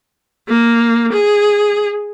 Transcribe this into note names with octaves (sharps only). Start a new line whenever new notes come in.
A#3
G#4